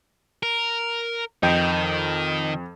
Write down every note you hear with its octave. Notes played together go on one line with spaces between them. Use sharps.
A#4
F2 D#3 D#5 G5